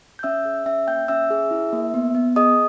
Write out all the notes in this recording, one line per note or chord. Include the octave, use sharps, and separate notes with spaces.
G6
C#4 E5 E6
G#4
C#4 E5 E6
A#3 G5 G6
C#4 E5 E6
G#4
E4
A#3
B3
B3
G#4 D#5 D#6